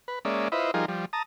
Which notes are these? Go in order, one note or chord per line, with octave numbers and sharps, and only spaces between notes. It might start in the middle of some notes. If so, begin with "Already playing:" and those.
B4
G#3 A#3 C#4 D5 E5
E4 F4 B4 C5 D#5 E5
F3 G3 D#4 F4 G#4 A#4
F3 G3
A5 A#5 D#6